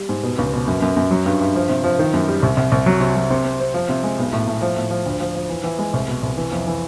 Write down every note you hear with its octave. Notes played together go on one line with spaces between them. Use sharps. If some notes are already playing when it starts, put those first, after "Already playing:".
Already playing: G3
G#2
B2
C#2
B2
F#2
F#2
F#2
F#3
G2
G2
F3
C3
F3
D#3
F#2
G3
C2
C2
C2
F#3
C3
F#3
C3
C4
C4
F3
C3
G#3
B1
A2
A2
F3
A2
F3
D2
F3
F3
E3
E3
G#3
C2
B2
C2
E3
F2
E3